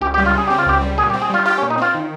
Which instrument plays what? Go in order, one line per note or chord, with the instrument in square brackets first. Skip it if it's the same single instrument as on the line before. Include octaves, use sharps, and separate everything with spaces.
[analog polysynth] C#2 [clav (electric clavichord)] G4
[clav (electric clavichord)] G4
[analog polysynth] G3
[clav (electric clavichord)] F4
[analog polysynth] C#3 [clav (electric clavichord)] G#4
[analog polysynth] C4 [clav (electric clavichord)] G4
[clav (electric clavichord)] F4
[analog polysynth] C#2 [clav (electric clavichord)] G4
[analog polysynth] G3
[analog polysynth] A#2 [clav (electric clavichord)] G#4
[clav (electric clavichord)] G4
[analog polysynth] C4
[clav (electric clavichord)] G#4
[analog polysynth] G3 [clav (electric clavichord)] F4
[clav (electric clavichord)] F4 [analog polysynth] G4
[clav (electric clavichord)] C#4
[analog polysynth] A#2
[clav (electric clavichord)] D#4
[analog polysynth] C4 [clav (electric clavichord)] F4
[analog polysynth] D#3